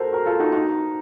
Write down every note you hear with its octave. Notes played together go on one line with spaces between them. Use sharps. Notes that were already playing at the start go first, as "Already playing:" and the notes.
Already playing: F#4 A4 A#4 C5
F#4 A#4
F4 A4
D#4 F#4
D#4 F#4